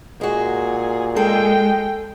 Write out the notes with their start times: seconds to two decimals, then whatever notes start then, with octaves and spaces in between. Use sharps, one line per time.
0.21 A#2 G#3 F#4 G#4
1.16 G#3 G#4 A4 G5